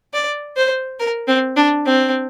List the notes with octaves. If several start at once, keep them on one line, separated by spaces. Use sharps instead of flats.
D5
C5
A#4
C4
D4
C4